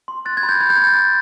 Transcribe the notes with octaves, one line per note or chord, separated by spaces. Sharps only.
C6
F#6 A6
G#6
B5
G6
B5 G#6
G6
B5 G#6
A6
B5